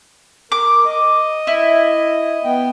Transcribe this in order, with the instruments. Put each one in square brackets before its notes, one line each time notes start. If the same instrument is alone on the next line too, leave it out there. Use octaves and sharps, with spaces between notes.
[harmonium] A#4 [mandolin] D6
[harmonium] D#5
[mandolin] E4
[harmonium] B3 G5